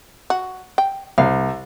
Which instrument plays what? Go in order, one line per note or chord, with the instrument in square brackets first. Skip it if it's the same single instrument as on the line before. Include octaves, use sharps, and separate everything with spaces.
[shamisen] F#4
G5
[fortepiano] C2 [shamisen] F5